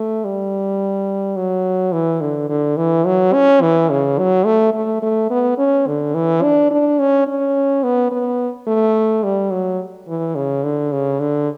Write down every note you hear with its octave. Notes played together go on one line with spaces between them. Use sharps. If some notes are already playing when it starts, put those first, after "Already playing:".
Already playing: A3
G3
F#3
E3
D3
D3
E3
F#3
C#4
E3
C#3
F#3
A3
A3
A3
B3
C#4
D3
E3
D4
D4
C#4
C#4
B3
B3
A3
G3
F#3
E3
C#3
D3
C#3
D3